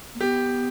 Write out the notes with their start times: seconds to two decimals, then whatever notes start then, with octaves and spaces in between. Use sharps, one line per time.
0.15 A#3
0.20 B3 G4